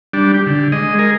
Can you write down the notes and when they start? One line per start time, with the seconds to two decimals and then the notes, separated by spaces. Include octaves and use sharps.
0.13 G3 D4
0.34 G4
0.47 D3
0.72 G#3 D#5
0.99 G#4 A#4